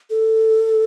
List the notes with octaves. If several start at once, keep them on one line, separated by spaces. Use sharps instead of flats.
A4